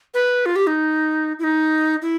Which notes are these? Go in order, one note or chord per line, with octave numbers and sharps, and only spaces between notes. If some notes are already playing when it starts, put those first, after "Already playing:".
B4
F4
G4
D#4
E4
D#4
E4